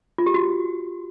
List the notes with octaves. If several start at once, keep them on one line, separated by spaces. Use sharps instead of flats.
F4
G4
F#4